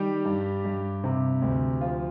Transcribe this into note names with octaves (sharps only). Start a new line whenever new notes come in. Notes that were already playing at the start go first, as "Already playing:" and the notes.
Already playing: D#3 G3 G4
G2
G2
C3
D2
F3 F4